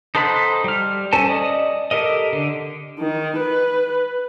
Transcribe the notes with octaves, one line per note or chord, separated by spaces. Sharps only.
D#4 A4 C5 F#5 B5
G3 F6
C#4 A4 C5 G#5 A5
D5 D#5
G4 A4 A#4 D#5
D3
D#3
B4